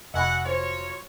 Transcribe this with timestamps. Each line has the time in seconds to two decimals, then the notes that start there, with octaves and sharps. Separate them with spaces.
0.14 F1 F#4 D#5 E5 F#5 G#5 B5
0.46 F#3 F4 C5 C#5